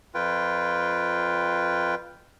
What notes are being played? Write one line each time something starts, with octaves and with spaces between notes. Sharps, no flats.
F2 F4 B4 G5